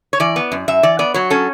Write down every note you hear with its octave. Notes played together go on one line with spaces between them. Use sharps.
C#5
E3 D5
B3
F#2
F#2 E5
E3 D5
B3 D5
F#3 C#5
C#4 A4